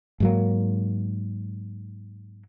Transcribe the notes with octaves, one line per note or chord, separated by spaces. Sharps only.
G#2 F#3 A#3